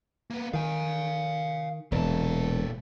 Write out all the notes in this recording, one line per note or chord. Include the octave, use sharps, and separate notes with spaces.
A#3 B3
D#3 F5 G#5
E1 A#2 A4